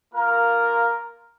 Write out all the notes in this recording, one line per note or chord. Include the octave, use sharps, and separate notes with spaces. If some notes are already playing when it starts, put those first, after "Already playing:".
A#3 F4 A#4